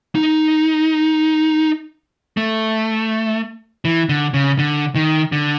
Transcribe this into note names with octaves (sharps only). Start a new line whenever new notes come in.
D#4
A3
E3
D3
C#3
D3
D#3
D3